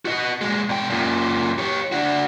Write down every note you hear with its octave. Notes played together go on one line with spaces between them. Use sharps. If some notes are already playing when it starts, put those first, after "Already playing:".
F#4 D#5
A#2 G#3
B2 G5
F#2 A#2
G4 C#5
D4 F#4